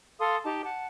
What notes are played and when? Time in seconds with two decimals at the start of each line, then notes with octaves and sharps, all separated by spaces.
0.19 A4 F5 C6 D#6
0.44 D#4 G4 A5
0.64 F#5 A5